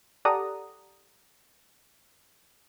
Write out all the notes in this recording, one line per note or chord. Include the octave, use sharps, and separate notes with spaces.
G4 A4 D5 F#5 A#5 D#6